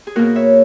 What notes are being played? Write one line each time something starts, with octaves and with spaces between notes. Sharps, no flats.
G#4
B2 A#3 F#4 A#4
C#5 E5